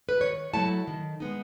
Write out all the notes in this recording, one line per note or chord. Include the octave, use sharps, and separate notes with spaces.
B4
D#3 C#5
F#3 A3 E4 A5
D#3
G#3 B3 D#4